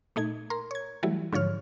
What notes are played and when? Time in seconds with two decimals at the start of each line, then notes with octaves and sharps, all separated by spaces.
0.16 A#2 A3 D#4 G#6
0.50 A#4 A#5 C6
0.71 C#5 G#6
1.03 E3 F#3 G3 A3 E4
1.33 G#2 D3 F3 C#5 F6